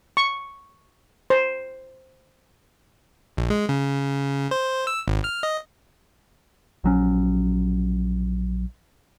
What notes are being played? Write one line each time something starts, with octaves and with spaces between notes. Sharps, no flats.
C#6
C5
A#1
G#3
C#3
C5
E6
G#1
F6
D#5
A#1 F#3 C#4